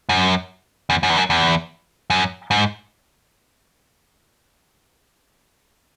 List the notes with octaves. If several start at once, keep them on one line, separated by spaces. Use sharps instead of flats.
F#2
E2
F#2
E2
F#2
E2
F#2
G#2